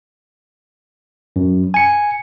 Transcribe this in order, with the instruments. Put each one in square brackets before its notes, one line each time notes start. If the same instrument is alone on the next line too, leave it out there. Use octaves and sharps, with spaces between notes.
[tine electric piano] F#2
G#5 C#7